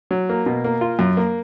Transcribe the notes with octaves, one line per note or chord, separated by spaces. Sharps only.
F#3
A#3
B2
A#3
F4
F#2
A#3